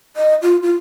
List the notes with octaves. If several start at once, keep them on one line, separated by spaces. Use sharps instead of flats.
D#5
F4
F4